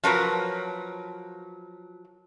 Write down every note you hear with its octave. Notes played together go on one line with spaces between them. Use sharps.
F3 F#3 A#4 B4